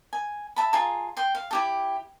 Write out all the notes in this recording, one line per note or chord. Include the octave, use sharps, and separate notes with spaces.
G#5
E5 A5 B5
F4 G#4 A5 A#5
G5 C6
F5
E4 G4 A4